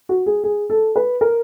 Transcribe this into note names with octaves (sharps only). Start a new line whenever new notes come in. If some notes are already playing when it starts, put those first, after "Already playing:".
F#4
G#4
G#4
A4
B4
A#4